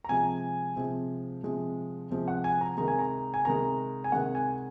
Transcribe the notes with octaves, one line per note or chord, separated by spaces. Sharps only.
A#5
C3 F3 G#3 G#5
C3 F3 G#3
C3 F3 G#3
C3 F3 G#3
F#5
G#5
A#5
C3 D#3 G#3 A#5
G#5
A#5
G#5
C3 D#3 G#3 A#5
G#5
C3 D#3 G#3 F#5
G#5